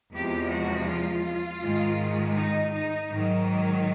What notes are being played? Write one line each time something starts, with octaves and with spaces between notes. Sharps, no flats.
E2 C3 F3 G#3 G4
F#4
F4
G#2 D#3 G#3
D#4
D#4
G#2 D#3 F#3